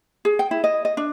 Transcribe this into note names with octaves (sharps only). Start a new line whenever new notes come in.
G#4
G5
E4
D#5
D#5
D4